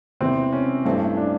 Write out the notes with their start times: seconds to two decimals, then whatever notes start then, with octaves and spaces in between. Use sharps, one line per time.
0.20 E1 E2 C3 E3 C4
0.53 C#4
0.85 A1 G2 E3 A3 C4
1.17 D4